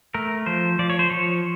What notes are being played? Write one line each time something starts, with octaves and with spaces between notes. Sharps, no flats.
A3 A#4
F3 C5
F3 D5
C#5
C5
F3 C#5